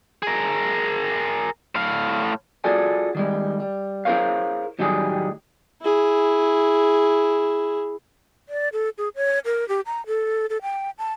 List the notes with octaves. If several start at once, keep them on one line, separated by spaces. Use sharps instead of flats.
G#4 A#4
A2 F5
F4 F#4 G#4 A4 D5 G#5
D#3 G3 G#3
G3
E4 G#4 A#4 C5 C#5 F5
A2 D#3 F#3 G3 G4 G#4
E4 G#4
D5
A4
G#4
C#5
A#4
G4
A#5
A4
A4
G5
A5